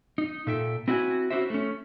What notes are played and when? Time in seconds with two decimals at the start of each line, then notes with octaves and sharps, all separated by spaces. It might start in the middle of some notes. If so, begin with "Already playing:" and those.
0.18 D#4
0.47 A#2 A4 E5 G5
0.88 C4 E4 F#4 E5 G#5
1.30 C#4 E4 F#4 G4 C5 E5
1.50 A3 C#4